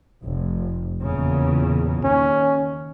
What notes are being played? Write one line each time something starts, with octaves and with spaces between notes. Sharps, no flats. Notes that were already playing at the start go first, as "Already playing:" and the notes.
F1
E2 A#2 C#3
D#2 C#4